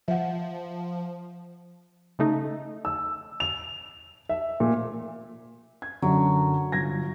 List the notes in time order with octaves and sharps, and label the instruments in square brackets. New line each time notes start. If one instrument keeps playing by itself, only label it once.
[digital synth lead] F3 [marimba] E5 F#5
[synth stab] C#3 A3 D#4
[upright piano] E6
F7
E5
A#2
G#6
[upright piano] F#2 D3 [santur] F#3
[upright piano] G1 G#6 A#6